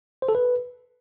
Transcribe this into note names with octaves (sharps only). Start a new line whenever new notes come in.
C5
A4
B4